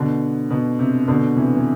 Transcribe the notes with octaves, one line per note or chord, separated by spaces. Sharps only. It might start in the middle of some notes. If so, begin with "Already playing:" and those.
Already playing: B2 D3
B2
C3
B2 D3
C3 E3
E3